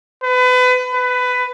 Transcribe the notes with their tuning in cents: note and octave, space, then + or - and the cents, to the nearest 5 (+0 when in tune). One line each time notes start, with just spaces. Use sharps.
B4 +30
B4 +15